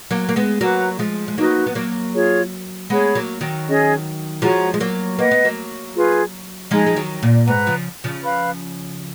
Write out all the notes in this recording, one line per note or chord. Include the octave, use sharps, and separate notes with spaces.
F#3 A#3
A#3
G#3 B3
F#3 A#3 F#4 B4 F#5 A#5
F3 G#3
G#3
F#3 A#3 D#4 F#4 B4
B3
F#3 A#3
F4 G#4 C#5
G#3 B3 G#4 C#5 F#5 B5
F#3 A#3
D#3 F#3
C#4 G#4 D#5
F3 G#3 F#4 C#5 F#5 A#5
G#3
F#3 A#3
A#3 B4 D#5 F#5
B3
F#3 A#3
F4 G#4 B4
F3 G#3 D#4 G#4 D#5 A#5
G#3
D#3 F#3
A#2
G#2 B4 F#5 A#5
C#3 F3
C#3 F3
B4 F5 B5